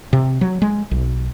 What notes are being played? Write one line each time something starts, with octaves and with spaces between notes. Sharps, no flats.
C3
F#3
G#3
B1